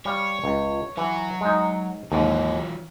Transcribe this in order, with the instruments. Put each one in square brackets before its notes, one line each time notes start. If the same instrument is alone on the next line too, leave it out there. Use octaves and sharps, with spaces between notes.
[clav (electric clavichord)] G3 F5 [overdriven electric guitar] C#5
[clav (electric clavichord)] C#2
[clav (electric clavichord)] E3 [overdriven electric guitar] F#3 F#4
[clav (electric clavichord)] G#3 D#4
[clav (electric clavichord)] D#2 G#2 [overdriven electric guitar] E3 F#3